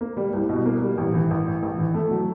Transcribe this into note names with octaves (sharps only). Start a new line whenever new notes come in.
A#3
G3
C2
B2
A#3
G3
A1
E3
A1
A2
A1
E3
A3
F#3